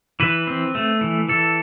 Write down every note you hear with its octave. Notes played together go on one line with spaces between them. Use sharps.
E3 B4
C4
A3
E3
E3 A4